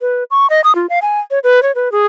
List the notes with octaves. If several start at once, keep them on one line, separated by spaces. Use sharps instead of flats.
B4
C#6
D#5
D#6
F4
F5
G#5
C#5
B4
C#5
B4
G#4